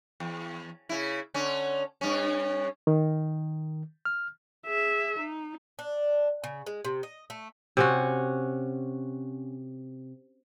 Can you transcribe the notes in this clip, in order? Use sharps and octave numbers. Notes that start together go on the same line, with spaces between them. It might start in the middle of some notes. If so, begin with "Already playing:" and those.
E2
C#3 E4
D3 C#4
G2 C#4
D#3
F6
G#4 E5
D#4
D4
C#3
G#3
C3
D#5
A3
C3 C#4 F#4